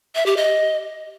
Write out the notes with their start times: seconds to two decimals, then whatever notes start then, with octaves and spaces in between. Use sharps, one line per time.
0.15 E5
0.26 G4
0.37 D#5